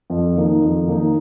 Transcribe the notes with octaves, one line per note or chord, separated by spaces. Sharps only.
F2
D#3 A#3 D#4
F2
D#3 A#3 D#4